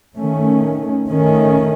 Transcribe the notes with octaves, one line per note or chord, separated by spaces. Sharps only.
D#3 A3 C#4
D#3 A3 C#4